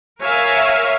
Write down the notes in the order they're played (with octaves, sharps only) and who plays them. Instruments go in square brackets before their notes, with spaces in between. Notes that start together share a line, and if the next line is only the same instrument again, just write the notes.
[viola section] A#4 C#5 E5 F5 G#5